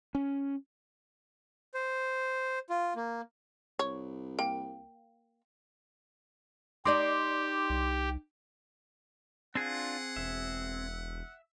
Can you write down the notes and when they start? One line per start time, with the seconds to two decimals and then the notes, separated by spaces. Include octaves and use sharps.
0.15 C#4
1.74 C5
2.70 F4
2.96 A#3
3.79 C2 C#5
4.39 A#3 G5
6.85 D#4 G4 D5 D#5 C6 D6
7.70 C2
9.55 C4 D4 F4 G#4 F#5
10.16 E1 E5